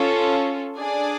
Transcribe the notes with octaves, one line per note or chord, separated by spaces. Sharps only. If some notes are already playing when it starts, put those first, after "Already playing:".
Already playing: C#4 F4 A4
D4 G#4 D5 G#5